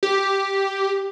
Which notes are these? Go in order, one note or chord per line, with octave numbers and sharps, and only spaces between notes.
G4